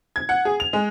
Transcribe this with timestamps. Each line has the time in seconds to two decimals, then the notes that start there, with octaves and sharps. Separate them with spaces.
0.16 G#6
0.29 F#5
0.45 G#4
0.60 F7
0.73 G#3